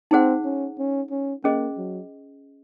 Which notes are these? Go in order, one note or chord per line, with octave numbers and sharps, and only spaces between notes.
C4 D#4 G#4 C5 F#5
C#4
C#4
C#4
A#3 C#4 G#4 C5 D#5
F#3